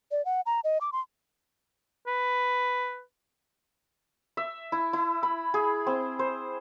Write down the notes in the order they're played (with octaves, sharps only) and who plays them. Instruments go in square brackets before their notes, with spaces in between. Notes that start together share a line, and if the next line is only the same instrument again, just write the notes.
[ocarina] D5
F#5
A#5
D#5
D6
C6
[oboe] B4
[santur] E5
E4
E4
B5
G#4
C4
C5